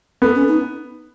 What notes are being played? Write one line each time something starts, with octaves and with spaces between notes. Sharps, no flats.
B3 A4
C#4
D#4